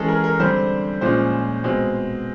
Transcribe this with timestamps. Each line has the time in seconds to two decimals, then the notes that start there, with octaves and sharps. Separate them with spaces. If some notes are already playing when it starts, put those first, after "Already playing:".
Already playing: E3 G#3 C#4 G#4 A4
0.08 A#4
0.24 A#4
0.40 D3 G3 C4 C5
1.01 A#2 F3 G#3 C#4 C5
1.64 B2 G#3 C4